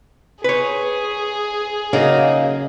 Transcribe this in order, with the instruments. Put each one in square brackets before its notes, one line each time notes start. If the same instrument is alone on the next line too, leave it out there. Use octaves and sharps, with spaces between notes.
[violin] G#4 [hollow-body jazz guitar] B4 C#5
[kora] C#3 [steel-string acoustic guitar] F#3 A#3 D#4